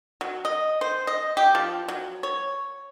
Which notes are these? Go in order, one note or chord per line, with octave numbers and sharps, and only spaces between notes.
F#3
D#5
C5
D#5
G4
F3
F#3
C#5